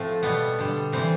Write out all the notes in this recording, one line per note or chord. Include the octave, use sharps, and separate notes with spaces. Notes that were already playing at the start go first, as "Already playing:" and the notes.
Already playing: A2 F3 A3 C4
B2 G3 B3
D3 G3
C3 E3 G3 C4